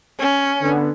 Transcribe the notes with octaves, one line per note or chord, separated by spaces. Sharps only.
C#4
D3 B3